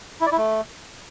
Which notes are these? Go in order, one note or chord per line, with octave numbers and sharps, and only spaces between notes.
E4
D5
E4
A3